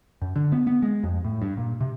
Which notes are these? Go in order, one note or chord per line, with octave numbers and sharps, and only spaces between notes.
F#2
D3
B3
B3
G#3
F2
A2
G2
A#2
C3